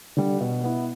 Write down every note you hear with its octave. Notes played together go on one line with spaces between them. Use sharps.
D3 G3
B2
B3 E4